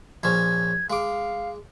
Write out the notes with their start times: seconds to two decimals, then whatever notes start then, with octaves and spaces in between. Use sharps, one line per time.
0.23 A#1 F3 C#4 G#6
0.90 G#3 F5 D6